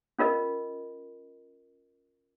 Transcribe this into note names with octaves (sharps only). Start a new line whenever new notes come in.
C#4 F4 A#4 D#5